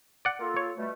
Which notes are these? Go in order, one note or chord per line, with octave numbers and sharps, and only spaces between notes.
D5 F#5
A#3 F4 A4
C#5
B2 G3 A3